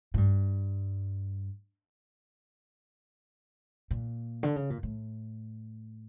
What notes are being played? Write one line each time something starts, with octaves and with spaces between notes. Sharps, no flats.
A2
G2
A#2
D3
C#3
A#2
A2